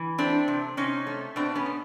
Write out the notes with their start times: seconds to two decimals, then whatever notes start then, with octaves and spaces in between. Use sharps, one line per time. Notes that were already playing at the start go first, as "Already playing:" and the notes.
Already playing: E3
0.18 A3 C4 D4
0.48 C3
0.77 C3 C#4 D#4
1.07 A3
1.36 B2 C4 D4
1.55 B3 C#4
1.66 B2